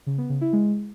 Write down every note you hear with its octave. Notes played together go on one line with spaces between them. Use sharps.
C#3
B3
C#3
E4
G#3